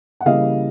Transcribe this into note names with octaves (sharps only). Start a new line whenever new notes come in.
F#5
C#3 E3 G3 A#3 D#5 F5